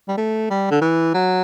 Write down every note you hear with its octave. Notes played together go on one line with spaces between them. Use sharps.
G3
A3
G3
D3
E3
F#3